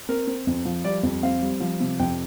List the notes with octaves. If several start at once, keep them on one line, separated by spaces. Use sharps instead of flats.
C4 A#4
C4
F2
F3
G3 D5
F2
C4 F5
G3
F3
C3
F2 G5